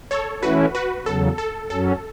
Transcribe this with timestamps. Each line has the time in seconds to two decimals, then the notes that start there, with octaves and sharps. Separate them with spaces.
0.11 A4 C#5
0.43 E3 A3 C#4 E4 F#4 B4
0.75 F#4 B4
1.06 E2 C#3 F#3 A4
1.38 A4
1.70 F#2 F#3 C#4 A4